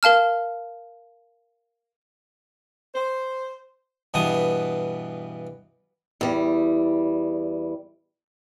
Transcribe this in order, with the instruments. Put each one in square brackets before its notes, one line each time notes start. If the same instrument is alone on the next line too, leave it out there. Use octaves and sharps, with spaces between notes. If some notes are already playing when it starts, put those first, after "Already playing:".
[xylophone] A#4 F5 A5 F6
[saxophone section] C5
[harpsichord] G2 B2 E3 B3 D#6
[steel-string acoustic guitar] E2 G3